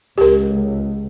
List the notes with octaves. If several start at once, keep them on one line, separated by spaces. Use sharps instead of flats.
C#2 G4 A#4